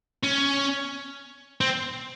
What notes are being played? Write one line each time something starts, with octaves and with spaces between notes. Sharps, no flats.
C#4
C4